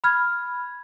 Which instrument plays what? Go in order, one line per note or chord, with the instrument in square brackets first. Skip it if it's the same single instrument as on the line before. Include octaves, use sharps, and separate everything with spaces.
[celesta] B5 F6 G#6